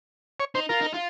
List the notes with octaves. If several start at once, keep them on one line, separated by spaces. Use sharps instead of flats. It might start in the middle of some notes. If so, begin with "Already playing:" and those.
C#5
D#4 C5
F4 A#4
D#4
F4